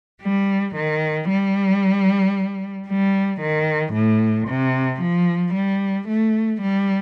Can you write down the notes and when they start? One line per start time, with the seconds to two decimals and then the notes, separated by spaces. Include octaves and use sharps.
0.21 G3
0.75 D#3
1.29 G3
2.88 G3
3.41 D#3
3.94 A2
4.48 C3
5.01 F3
5.54 G3
6.08 A3
6.61 G3